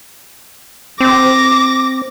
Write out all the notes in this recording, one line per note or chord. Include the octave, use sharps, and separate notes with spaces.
C4 D6 A#6